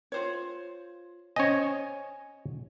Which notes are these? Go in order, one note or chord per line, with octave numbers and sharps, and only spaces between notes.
F4 C5 C#5
C#4 C5 C#5 D#5 G#5